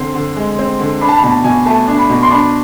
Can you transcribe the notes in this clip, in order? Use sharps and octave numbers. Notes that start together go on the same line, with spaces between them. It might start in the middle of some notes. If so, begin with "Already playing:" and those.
Already playing: D3 C4 C6
D3
G#3
C4
D3
D4 B5
A5
B5
B2 A5
B2 G#5
A3 A5
D4
B5
B2
C6
D4 B5